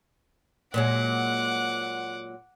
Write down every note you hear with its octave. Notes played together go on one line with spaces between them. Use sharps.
A#2 F#3 G#3 F#5 D6